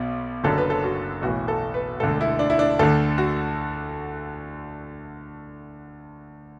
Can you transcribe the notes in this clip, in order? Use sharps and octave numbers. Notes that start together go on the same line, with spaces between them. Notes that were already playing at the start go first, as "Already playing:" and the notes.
Already playing: B1 B2
F#1 F#2 D3 A4
B4
A4
F#4
B1 A2 E3 F#4
A4
B4
E1 D2 D3 A4
E4
D4
E4
D4
D2 D3 A4
F#4